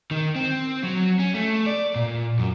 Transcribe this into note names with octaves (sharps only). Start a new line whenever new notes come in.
D#3
C4
F#3
C#4
A3
D5
A#2
F#2